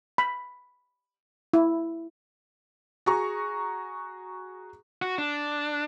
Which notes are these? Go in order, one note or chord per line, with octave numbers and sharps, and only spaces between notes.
B5
E4
F#4 G#4 A#5 C#6
F#4
D4